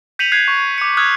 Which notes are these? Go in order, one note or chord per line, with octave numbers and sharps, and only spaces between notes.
G6 B6 C#7 D#7 F7 F#7
F#6 G#6 C7
C#6
D6 C#7
D#6 F6 F#6 G#6